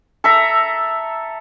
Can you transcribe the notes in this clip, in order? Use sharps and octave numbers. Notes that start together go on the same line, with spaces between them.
A4 E5 A#5